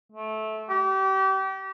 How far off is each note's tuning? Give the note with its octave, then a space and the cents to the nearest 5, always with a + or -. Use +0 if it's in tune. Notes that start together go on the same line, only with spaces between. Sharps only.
A3 -20
G4 -30